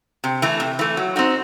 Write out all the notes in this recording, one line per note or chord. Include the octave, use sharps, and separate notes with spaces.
C3
E3 A3
C3
E3 A3
F#3
C4 D#4 F#4